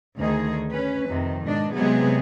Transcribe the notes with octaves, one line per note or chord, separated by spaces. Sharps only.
D2 D#3 D#4 G#4
C#4 B4
F2 C3 D#3
G#2 B2 D4 D#5
C3 F#3 G#3 B3 G#4